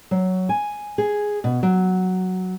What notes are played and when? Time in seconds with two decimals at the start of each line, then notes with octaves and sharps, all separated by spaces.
0.11 F#3
0.49 G#5
0.98 G#4
1.44 B2
1.63 F#3